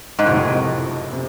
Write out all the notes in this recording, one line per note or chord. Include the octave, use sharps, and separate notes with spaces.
G#2
F#1 F2 A2 C3
C3